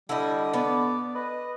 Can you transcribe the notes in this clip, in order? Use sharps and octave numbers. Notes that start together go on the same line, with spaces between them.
D3 G3 E4 D#5
B3 D5
B4 D#5